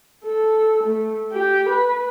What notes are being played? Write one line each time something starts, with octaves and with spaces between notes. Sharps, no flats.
A4
A3
G4
B4